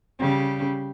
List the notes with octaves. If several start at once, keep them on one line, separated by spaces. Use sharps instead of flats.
C#3 G3